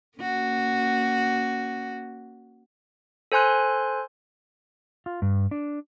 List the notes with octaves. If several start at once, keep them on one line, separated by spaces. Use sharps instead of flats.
A#3 C#4 F#4
A4 C5 G#5 C6 F#6
F4
G2
D4